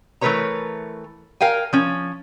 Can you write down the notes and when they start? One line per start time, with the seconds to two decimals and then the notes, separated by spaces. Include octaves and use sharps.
0.21 E3 A3 A#4 B4 C#5 A#5
1.41 A#4 F5 G5 G#5
1.73 F3 C#4